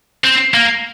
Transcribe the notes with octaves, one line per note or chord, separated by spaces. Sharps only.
C4
A#3